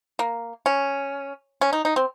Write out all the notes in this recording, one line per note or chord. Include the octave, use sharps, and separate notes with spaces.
A#3
C#4
C#4
D#4
D#4
C4